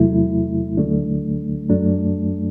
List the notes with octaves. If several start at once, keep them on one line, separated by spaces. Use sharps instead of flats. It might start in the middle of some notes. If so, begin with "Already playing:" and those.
Already playing: E2 C3 F#3 A3 E4
D2 D3 F#3 A3 D4
F#2 F#3 A3 D4